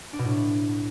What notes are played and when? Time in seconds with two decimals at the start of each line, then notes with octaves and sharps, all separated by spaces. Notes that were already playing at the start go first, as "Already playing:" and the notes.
0.13 D4
0.19 B2
0.25 A2